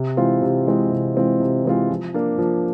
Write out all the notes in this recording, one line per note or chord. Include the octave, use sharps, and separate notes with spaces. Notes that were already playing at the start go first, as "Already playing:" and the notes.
Already playing: C3
E3 G#3 C4 F4
C3
E3 G#3 C4 F4
C3
E3 G#3 C4 F4
C3
E3 G#3 C4 F4
F3
A#3 D4
F3